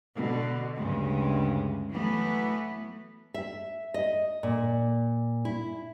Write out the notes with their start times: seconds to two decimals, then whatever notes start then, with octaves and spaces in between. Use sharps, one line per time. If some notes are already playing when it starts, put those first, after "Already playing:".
0.15 B2 D3
0.75 D2 G2 C#3 G#3
1.90 E3 F#3 A3 B3
3.34 E5
3.94 D#5
4.43 A#2
5.45 E4